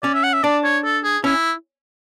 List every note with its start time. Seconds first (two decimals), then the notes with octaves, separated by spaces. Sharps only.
0.03 C#4 D5
0.14 E5
0.23 F#5
0.33 E5
0.44 D4 D5
0.64 C#5
0.85 A4
1.04 G#4
1.24 C#4 E4